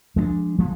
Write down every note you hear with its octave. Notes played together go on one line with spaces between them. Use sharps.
F3 G#3 B3 D4
F3 G#3 B3